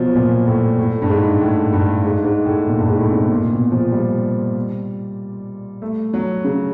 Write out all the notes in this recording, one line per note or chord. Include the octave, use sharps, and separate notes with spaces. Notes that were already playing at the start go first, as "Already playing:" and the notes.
Already playing: B2 F3 F#3
A#2
A2
A2
G2
G#2
A2
G2
G#2
G#2
A2
A#2
G2
G#2
A2
C3
B2
A#2
B2
F3
G3
A3
F#3
C#3